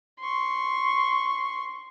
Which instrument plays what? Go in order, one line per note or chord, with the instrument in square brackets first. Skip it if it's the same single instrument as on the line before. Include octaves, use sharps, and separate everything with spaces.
[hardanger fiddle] C6 C#6